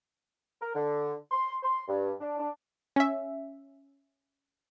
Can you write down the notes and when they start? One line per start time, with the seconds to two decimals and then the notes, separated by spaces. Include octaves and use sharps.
0.61 A#4
0.75 D3
1.31 C6
1.63 C6
1.88 G2
2.20 D4
2.38 D4
2.96 C#4 E5